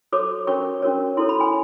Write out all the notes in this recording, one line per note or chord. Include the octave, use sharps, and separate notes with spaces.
F#4 A4 C#5 D6
C#4 F#4 A#4 C#5 C#6
C#4 F#4 A#4 C#5
E4 A4 C#5 C6
B5
G#5